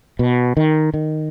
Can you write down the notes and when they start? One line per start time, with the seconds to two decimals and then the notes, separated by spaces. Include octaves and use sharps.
0.19 B2
0.57 D#3
0.94 D#3